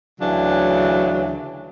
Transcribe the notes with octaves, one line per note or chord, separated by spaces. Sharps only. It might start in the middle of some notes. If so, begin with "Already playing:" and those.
D2 C#3 E3 F#3 D4